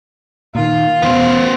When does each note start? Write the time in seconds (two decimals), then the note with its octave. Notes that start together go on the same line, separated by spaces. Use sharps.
0.55 A#2 D#3 F4
1.02 E2 B2 B3 C5